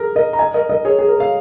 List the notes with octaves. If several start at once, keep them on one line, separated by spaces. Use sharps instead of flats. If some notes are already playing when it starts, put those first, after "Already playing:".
Already playing: G#4 A#4
A#4 D#5
A#5
D#5 G#5
A#4 D#5
A#4 D#5
G#4 C#5
G#4
A#4
F5